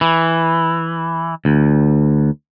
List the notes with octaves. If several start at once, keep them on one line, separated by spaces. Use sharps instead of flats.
E3
D2